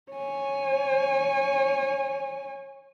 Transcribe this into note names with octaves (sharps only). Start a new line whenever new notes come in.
C#5 G#5